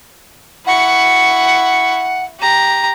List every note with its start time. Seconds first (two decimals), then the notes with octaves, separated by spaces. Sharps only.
0.66 E4 F#5 C#6
2.40 G4 A#5